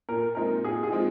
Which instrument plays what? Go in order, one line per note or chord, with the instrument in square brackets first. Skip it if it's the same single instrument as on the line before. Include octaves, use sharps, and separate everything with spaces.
[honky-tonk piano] A#2 [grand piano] A#4
[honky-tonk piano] F3 G#3 C4 D#4 [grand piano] A#4
[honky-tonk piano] A#2 [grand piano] G#4
[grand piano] G#4
[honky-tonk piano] F3 G#3 C4 D#4